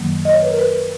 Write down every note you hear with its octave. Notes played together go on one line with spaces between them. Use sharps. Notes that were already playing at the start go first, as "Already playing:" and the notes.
Already playing: F#2 D#3 F#3 A#3
D#5
C#5
B4
A#4
B4